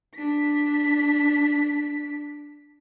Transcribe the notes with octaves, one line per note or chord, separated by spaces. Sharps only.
D4 B6